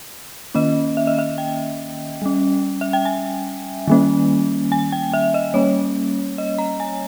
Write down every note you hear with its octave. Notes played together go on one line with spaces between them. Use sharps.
D#3 A#3 C#4 D#5
E5
D#5
E5
G5
G3 C#4
E5
G5
G#5
D#3 G3 A#3 C#4
G#5
G5
E5
D#5
G3 A#3 C#4 C#5
D#5
A#5
G#5